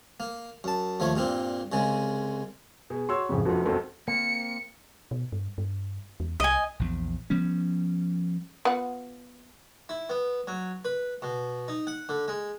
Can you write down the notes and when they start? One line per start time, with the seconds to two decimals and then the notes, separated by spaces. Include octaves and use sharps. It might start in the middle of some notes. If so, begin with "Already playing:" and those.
0.20 A#3
0.64 F#2 A5
1.00 D#2 F3 A3 C#5
1.16 G2 A#2 A#3 C4
1.72 C2 C#3 G#3
2.90 B2 G#4
3.09 F#4 C#5 C6 E6
3.29 A1 F2 C#3
3.45 F1 A#1 F2 F3 F#4 A4
3.65 E1 B1 F2 C4 F#4 A4
4.08 A#3 C4 C#7
5.11 B2
5.32 G2
5.58 G2
6.20 E2
6.40 C2 D#5 G#5
6.79 A#1 E2
7.30 F3 G3 B3 C#4
8.65 B3 F4 F#5
9.89 E4
10.10 B3
10.47 F#3
10.85 B4
11.22 B2
11.68 D#4
11.87 F#5
12.09 D3
12.28 G#3